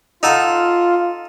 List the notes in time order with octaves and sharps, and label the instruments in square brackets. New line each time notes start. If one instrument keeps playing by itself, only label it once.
[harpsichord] D#4 A4 F#5 [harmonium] F4